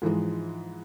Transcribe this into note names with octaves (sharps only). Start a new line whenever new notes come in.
G#2 E3 F3 G#3